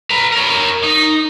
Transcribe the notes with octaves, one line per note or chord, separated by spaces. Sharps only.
B4 A#5
A#4 C#5
D#4